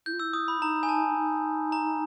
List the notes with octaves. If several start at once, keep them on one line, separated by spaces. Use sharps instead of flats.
E4 G6
F4
E4 E6
D#6
B5
D#4 A#5
G#5
A5
D#4
A#5